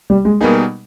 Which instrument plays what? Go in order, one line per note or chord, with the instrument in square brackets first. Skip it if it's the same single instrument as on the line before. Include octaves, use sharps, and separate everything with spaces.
[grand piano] G3
G#3
[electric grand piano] B2 G3 B3 D#4 G#4 [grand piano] A#3